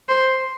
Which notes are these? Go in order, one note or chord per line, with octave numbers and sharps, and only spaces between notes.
C5